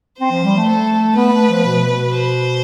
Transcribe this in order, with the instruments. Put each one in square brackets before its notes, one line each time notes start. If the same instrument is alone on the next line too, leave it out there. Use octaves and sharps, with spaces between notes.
[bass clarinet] C4 [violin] C5
[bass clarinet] F3
G3
A3
[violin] A4
[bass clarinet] B3 [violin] B4
[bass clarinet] A3
F3
B2
[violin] C5